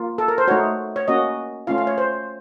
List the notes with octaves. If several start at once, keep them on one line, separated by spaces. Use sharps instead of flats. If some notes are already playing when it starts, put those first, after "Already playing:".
Already playing: A#3 F4
A4
A#4
C5
A3 D#4 F#4 C#5
C#5
A#3 C#4 F#4 D#5
A3 C#4 F4 F5
F5
C#5
C5